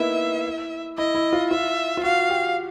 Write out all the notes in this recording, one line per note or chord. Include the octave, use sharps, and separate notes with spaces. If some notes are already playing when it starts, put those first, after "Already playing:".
Already playing: A#3 B3 D#4 E4 E5
E4 D#5
E4
F4
F4 E5
F4
F#4 F5
G4